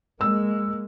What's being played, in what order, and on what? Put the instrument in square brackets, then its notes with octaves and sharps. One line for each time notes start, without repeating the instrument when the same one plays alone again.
[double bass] G#3 A#3 [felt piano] E6